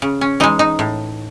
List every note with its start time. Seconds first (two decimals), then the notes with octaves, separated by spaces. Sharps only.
0.02 C#3
0.21 C#4
0.40 E3 G#3 D#4
0.59 D#4
0.79 A2